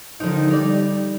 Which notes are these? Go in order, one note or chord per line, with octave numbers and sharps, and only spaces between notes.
D3 D#3 F3 D#4
G3 D#4 D5